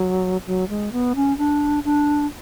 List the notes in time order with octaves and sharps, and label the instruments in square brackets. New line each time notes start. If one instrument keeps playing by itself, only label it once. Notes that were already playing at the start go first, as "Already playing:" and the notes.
Already playing: [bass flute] F#3
F#3
G#3
B3
C#4
D4
D4